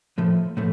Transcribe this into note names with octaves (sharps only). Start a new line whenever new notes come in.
A2 F3 A3
A2 F3 A3